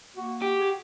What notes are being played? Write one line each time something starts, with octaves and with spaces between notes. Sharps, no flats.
A#3 F#4
F#4 G4
G#4